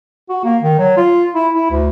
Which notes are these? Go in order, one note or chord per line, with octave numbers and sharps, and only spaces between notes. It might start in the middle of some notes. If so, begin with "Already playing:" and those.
F#4
A#3
D#3
F#3
F4
E4
E4
D2